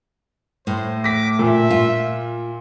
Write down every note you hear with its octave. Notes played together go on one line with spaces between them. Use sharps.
A2 A3 C5
D6 A#6 B6
A#2 E5
F4